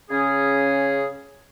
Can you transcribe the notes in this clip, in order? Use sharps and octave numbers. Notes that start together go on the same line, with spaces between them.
C#3 C#4 G#4